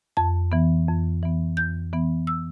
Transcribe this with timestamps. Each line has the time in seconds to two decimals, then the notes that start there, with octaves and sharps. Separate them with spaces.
0.17 F2 A5
0.52 E3 B3
0.88 F2
1.23 E3 B3
1.57 F2 G6
1.93 E3 B3
2.27 E6